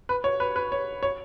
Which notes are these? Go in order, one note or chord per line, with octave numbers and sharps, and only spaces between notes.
B4
C#5
B4
B4
C#5
C#5